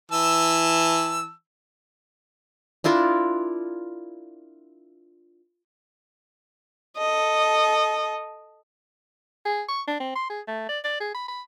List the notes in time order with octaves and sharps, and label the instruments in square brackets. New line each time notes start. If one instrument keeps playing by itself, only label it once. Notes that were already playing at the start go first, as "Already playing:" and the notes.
[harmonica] E3 A5 E6
[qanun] D4 E4 F4 A#4
[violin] A4 D#5
[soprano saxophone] G#4
C#6
D4
C4
C6
G#4
A3
D5
D5
G#4
B5
B5